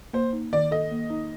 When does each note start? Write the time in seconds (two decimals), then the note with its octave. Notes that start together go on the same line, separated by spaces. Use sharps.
0.13 A#3 C5
0.33 D#4
0.53 D#3 D5
0.71 A4 D#5
0.91 A#3
1.10 D#4